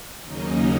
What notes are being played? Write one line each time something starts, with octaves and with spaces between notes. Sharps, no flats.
D#2 C#3 F#3 A#3 C#4 D#4 D#5